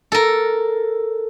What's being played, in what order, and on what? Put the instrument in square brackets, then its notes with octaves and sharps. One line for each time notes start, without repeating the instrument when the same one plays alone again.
[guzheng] A4 A#4